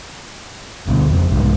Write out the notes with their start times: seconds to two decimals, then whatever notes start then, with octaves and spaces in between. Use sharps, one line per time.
0.87 D2 B2
1.10 F2 C#3
1.31 C2 G#2 C#3